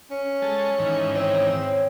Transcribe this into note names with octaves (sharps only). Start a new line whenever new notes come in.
C#4
G#3 A4
G#2 D#3 E3
C4 C#5